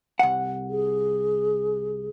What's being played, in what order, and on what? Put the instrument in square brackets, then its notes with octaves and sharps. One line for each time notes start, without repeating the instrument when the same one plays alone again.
[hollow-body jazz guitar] C2 F#5
[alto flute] G#4